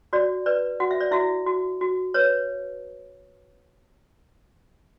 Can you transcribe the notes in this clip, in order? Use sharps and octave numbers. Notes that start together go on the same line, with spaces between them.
F#4 D5
B4 D5
F#4 F#5
E5
D5
E4 F#4 E5
F#4
F#4
B4 C#5